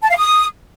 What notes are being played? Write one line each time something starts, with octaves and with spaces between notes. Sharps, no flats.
A5
F5
D#6